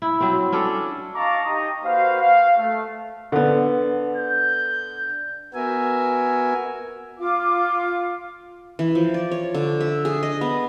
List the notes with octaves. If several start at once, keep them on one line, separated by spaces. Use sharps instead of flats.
E4
F#3 C4
C#4 D4 A4
D#5 F5 A5 A#5 C#6 D6
D#4 G4 D#5 A#5 D#6
A#3 F#4 B4 C5 F5
F5
A3
D3 B3
G6
B3 F#4 A#4 E5 G#5
F4 F5 D6
E3
F3
D5
C#5
D3
E5
G#4
D#5
B3